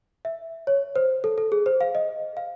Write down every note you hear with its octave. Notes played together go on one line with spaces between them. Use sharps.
E5
C#5
C5
A4
A4
G#4
C5
F5
D#5
F5